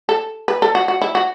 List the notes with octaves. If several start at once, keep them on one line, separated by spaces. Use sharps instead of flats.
A4
B4
A4
F#4
F#4
E4
F#4